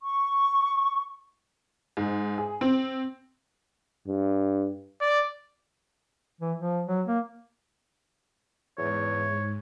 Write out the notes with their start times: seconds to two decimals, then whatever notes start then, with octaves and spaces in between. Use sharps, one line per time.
0.01 C#6
1.97 G#2
2.38 G#4
2.61 C4
4.08 G2
5.01 D5
6.41 E3
6.58 F3
6.87 F#3
7.07 A#3
8.78 E2 G#2 C#5